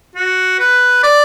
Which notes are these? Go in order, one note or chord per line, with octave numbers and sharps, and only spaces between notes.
F#4
B4
D5